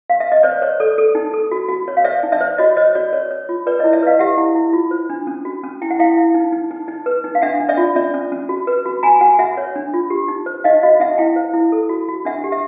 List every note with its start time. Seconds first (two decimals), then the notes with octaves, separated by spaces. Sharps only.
0.10 F5
0.20 E5
0.32 D#5
0.43 C5 D5
0.62 C5 C#5
0.80 A4 D5
0.98 A4
1.15 D#4
1.34 A4
1.52 F#4
1.69 F#4
1.88 C#5
1.97 F5
2.04 C5 D5 E5
2.23 D#4
2.32 D5 E5
2.41 C5
2.58 F#4 C#5 D#5
2.77 C5 C#5 D#5
2.95 F#4 D5
3.13 C#5
3.31 C#5
3.49 F4
3.67 B4 D5
3.79 E4 C#5 D#5
3.93 D5 E5
4.03 B4 D#5 F5
4.19 G4 E5 F#5
4.37 E4
4.55 E4
4.73 F4
4.91 C5
5.10 D4
5.27 C#4
5.45 F#4
5.64 C#4
5.82 E4 G5
5.91 F#5
5.99 E4 F5 G5
6.17 E4
6.34 D#4
6.53 D#4
6.71 D#4
6.88 D#4
7.06 B4
7.24 D#4
7.35 F5
7.42 D4 E5 F#5
7.60 D4
7.69 D5 E5
7.78 F4
7.96 C#4 D5 E5
8.14 C#4
8.32 C#4
8.49 F#4
8.67 B4
8.86 F#4
9.03 F#4 G#5 A#5
9.21 F#4 F#5 G#5
9.39 F#4 E5 F#5
9.57 C#5
9.76 D4
9.94 F4
10.10 G4
10.28 D#4
10.46 C5
10.64 D#4 D#5 F5
10.82 F#4 D#5 F5
11.00 D#4 E5 F#5
11.18 E4 F5 G5
11.36 C5
11.54 E4
11.72 A4
11.89 F#4
12.09 F#4
12.25 D4 E5 F#5
12.44 G4
12.52 E5